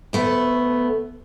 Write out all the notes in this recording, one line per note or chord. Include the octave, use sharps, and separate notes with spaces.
D2 A3 B3